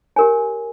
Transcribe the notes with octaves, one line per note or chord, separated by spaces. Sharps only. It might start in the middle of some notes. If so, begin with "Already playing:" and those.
G4 A#4 C#5 G#5